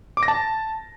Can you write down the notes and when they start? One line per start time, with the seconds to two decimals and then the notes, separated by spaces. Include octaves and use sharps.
0.17 D6
0.23 A#6
0.28 A5